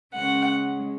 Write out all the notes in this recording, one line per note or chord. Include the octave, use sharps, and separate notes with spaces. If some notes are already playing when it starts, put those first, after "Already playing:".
C#3 G#3 C#4 F#5